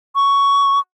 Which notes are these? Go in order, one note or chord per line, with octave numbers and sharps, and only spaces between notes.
C#6